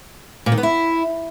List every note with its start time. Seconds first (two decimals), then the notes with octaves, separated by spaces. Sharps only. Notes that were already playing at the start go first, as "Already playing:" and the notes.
0.46 A#2
0.52 D#3
0.57 B3
0.63 E4